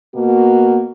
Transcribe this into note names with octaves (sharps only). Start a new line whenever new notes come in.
B2 A#3 F#4